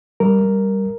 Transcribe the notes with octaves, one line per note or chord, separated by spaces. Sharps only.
G3 A#4
G3